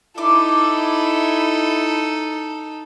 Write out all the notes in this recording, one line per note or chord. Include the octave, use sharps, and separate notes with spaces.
D#4 E4 A4 D5 D6